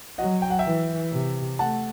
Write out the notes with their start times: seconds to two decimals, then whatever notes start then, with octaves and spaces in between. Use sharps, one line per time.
0.18 F#3 D#5 F#5
0.42 G5
0.50 F#5
0.59 E5 G5
0.66 E3
1.12 C3
1.59 A3 F#5 A5